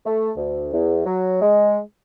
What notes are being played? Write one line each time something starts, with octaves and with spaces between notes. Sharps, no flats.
A3
D2
E2
F#3
G#3